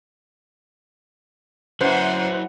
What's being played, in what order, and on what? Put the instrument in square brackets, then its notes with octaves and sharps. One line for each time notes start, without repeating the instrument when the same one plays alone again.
[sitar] F#2 [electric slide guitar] F#3 E4 [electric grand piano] B4 C5 [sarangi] F#5